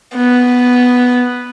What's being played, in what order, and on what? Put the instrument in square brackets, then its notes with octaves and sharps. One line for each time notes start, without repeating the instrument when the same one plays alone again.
[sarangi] B3